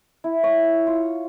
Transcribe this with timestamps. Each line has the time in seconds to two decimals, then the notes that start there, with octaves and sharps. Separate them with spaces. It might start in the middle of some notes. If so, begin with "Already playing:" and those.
0.24 E4
0.43 C#5
0.87 F4